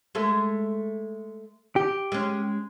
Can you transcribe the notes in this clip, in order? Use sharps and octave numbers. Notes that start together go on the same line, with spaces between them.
G#3 A3 A4
G4
G#3 C#4